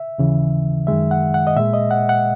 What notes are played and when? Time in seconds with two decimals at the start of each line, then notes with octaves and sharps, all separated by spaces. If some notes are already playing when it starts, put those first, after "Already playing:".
Already playing: E5
0.18 D#2 C#3 E3
0.87 F#2 D#3 G#3 E5
1.11 F#5
1.34 F#5
1.47 D#5
1.56 A#2 G#3 E5
1.74 D#5
1.91 F#5
2.09 F#5